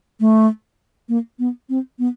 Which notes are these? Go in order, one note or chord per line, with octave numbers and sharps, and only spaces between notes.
A3
A#3
B3
C4
B3